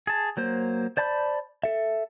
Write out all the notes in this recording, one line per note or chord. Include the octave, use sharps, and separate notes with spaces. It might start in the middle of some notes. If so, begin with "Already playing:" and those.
G#4 A5
F#3 A#3 C5
C5 D5 A5 B5 G6
A4 E5